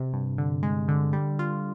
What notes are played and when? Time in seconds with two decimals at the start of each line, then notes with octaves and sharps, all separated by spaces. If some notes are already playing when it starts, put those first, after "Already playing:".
Already playing: C3
0.13 G2
0.38 D3
0.63 G#3
0.88 D3
1.13 G3
1.39 F4